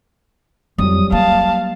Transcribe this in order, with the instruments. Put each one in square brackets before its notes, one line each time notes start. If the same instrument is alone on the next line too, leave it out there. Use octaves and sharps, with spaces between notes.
[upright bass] F2 [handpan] F#3 G3 [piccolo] D#6
[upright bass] A#3 [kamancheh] F5 [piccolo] A5